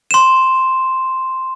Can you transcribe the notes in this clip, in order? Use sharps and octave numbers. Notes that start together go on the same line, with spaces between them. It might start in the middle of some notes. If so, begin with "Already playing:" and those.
C6 E7